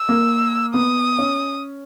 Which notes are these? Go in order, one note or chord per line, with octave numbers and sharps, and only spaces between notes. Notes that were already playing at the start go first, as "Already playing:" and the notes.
Already playing: E6
A#3
B3 D#6
C#4